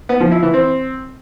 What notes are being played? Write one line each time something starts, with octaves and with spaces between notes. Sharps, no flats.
B3
F3
E4
E3
C4